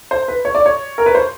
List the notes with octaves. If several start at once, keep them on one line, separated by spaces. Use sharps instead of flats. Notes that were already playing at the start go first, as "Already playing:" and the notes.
C5
B4
C#5
D5
C#5
A#4
B4
C5